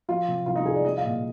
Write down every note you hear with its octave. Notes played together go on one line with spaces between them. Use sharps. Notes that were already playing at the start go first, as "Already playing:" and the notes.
F3 F4
C3
C2 F4
D#4
C2 G#4
D5
F3 D#5
F5
A#2